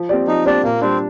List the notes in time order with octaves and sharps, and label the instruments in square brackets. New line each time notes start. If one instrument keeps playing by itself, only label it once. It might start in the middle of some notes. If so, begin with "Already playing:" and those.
Already playing: [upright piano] F3
C4 G4 D5
[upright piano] F3 [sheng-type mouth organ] D#4
[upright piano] C4 G4 D5 [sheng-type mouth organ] D4
[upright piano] A#2 [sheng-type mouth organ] A#3
[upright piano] G3 D4 [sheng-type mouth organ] C4